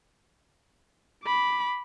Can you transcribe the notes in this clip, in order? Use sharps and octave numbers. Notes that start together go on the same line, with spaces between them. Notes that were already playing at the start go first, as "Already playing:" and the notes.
B5 D6